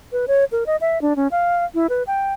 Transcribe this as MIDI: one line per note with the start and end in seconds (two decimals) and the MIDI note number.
0.12 0.25 71
0.28 0.45 73
0.52 0.64 70
0.66 0.76 75
0.81 1.01 76
1.02 1.16 62
1.16 1.28 61
1.31 1.64 77
1.75 1.87 64
1.89 2.03 71
2.07 2.33 79